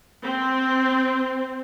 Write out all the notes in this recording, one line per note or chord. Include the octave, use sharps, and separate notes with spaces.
C4